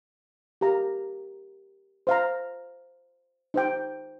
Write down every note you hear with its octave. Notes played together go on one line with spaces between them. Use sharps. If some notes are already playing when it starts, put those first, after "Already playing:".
G4 A#4 F5 A#5
C5 F5 A#5
D#4 C5 G5